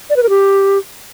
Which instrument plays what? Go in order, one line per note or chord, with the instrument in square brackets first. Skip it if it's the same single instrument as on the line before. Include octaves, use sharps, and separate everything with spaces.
[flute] D5
B4
A#4
G4